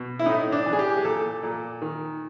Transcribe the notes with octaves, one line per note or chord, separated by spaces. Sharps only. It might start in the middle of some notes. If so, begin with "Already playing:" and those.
Already playing: B2
E4
A2 D#4
D4
E3
G#4
G4
G4
G#4
A#2 A4
A#2
D#3